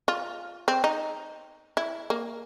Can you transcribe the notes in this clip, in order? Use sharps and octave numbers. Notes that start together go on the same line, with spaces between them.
F4
C4
D#4
E4
A#3